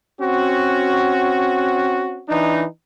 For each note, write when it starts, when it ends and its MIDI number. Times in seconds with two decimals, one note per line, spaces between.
0.20 2.23 60
0.20 2.23 61
0.20 2.23 66
2.29 2.64 52
2.29 2.64 62
2.29 2.64 63